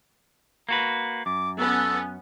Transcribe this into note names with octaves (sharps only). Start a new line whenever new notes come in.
A#3 F#4 B4
F#2 D6
B3 C#4 A4